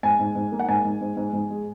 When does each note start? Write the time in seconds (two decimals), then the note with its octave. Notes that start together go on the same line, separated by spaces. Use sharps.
0.03 G#2 G#5
0.19 G#2
0.35 G#2
0.52 A#3
0.59 F#5
0.68 G#2 G#5
0.85 G#2
1.01 G#2
1.17 G#2
1.33 G#2
1.50 G#3